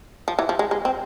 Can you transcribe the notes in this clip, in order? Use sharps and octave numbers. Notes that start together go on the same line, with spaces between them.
F3
E3
F3
G#3
G#3
C4